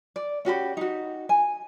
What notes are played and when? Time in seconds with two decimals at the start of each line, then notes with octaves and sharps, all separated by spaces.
0.16 D5
0.45 C#4 F#4 G4 B5
0.77 D#4 F#4
1.29 G#5